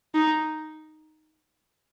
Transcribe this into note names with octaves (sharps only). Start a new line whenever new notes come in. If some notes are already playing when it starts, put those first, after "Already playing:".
D#4